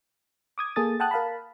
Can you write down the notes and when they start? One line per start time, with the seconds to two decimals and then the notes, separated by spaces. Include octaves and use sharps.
0.58 D6 D#6 G#6
0.76 A#3 G#4 A4 D#6 A6
1.00 F#5 G5 A5 D#6 F#6
1.11 A#4 F5 A5 B5